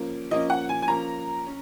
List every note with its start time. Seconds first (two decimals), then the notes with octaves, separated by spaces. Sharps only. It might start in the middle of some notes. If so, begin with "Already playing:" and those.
Already playing: F3 A#3 C#4
0.31 F3 A#3 C#4 D#5
0.50 F#5
0.69 G#5
0.82 G#5
0.88 F3 A#3 C#4 A#5
1.46 C#4